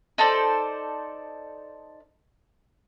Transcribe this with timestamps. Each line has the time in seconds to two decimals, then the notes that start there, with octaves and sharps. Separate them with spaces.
0.18 D#4 A4 C5 D5